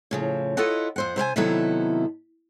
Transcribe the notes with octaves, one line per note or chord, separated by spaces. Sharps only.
A2 C#3 F3
E4 F4 A4 C#5 D#5 F#5
F2 C5 F#5
C3 C5 F5 G#5
C3 D#3 F#3 B3 E4 A4